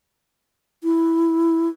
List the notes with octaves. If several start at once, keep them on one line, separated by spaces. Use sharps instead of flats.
E4